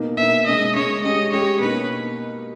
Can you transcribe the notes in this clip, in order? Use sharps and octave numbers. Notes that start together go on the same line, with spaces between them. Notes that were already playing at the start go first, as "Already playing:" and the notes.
Already playing: B2 A#3 D#4
B2 A#3 D#4 E5
C#3 G#3 C#4 D#5
C#3 G#3 C#4 C#5
G#3 C#4 G4 D#5
G#3 C#4 G4 C#5
B2 A#3 D#4 B4